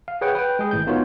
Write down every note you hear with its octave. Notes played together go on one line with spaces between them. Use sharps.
F5
G#4 B4 C#5 F#5 G5
B4 G5
G#3 G#4
G#1 A2 G6
B3 D#4 F4 F#4 A#4 C#5